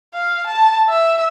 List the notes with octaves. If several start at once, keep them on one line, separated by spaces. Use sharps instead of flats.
F5
A5
E5